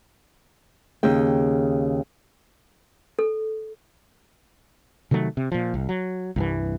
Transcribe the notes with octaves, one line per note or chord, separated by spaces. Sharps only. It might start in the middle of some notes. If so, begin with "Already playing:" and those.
D#2 C#3 G5
A4
C3 D#3 F#3 A3
C3
A#2 F3
C2
F#3
C2 G2 E3